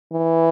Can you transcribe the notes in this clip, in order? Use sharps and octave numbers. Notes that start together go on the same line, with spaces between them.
E3